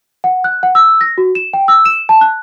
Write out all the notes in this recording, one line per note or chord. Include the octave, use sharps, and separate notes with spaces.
F#5
F#6
F#5
E6
A#6
F#4
E7
G5
E6
E7
A5
F#6